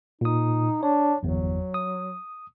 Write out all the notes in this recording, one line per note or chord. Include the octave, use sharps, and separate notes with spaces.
A#2 D#4 D#6
D4 C#5
G1 E2 F#3
D#6